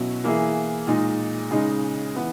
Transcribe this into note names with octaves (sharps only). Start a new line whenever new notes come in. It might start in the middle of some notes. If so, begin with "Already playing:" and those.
Already playing: B2 F#3 C#4 E4
E3 A#3 E4 G#4
A#2 G#3 D#4
C#3 G#3 D#4
E3 B3